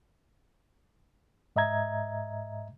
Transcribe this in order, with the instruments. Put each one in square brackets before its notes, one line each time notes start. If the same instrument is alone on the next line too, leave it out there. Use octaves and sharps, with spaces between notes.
[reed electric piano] G#2 D#5 E5 A#5 G#6